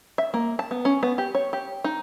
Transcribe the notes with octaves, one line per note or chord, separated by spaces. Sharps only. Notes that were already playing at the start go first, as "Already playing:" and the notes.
E5
A#3
A5
B3
C#4
B3
G4
C#5
G4
D#4